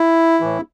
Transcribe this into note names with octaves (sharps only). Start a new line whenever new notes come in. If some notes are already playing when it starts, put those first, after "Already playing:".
Already playing: E4
A2 E3